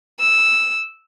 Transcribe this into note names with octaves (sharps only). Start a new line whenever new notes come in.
E6